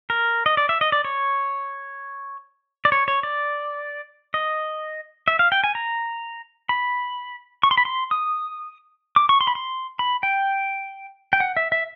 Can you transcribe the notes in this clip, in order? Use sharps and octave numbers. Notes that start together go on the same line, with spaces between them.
A#4
D#5
D5
E5
D#5
D5
C#5
D5
C#5
C#5
D5
D#5
E5
F5
G5
G#5
A#5
B5
C#6
C6
B5
C6
D#6
D6
C#6
C6
B5
C6
B5
G5
G5
F#5
E5
E5